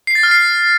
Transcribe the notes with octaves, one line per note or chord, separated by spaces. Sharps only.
C7
A6
F6
C7